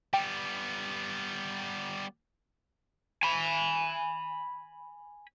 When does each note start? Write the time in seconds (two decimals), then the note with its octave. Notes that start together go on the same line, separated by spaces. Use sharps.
0.14 G3 B3 G5
3.23 G#5 B5